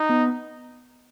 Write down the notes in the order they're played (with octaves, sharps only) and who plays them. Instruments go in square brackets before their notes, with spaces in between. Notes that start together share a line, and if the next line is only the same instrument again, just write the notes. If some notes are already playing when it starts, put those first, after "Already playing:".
Already playing: [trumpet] D#4
[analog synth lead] B3